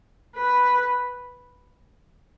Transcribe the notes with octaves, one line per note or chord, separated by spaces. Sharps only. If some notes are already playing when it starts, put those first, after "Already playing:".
B4